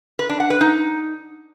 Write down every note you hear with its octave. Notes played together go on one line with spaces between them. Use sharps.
B4
D4
F#5
B4
D#4